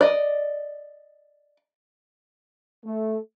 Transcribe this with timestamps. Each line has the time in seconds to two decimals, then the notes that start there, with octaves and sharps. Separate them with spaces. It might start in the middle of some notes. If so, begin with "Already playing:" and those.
0.01 D5 D#5
2.84 A3